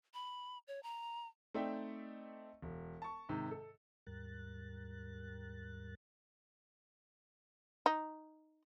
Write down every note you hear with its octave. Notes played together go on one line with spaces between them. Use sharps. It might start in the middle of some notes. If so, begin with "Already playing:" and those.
B5
C#5
A#5
A3 C4 D#4 D5 E5 G5
E1
A5 C#6
G#2 C3 D#3
A4
D#2 G#2 G3 A#4 F#6 A6
D#4